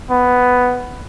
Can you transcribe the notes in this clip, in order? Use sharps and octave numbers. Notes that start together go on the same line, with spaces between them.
B3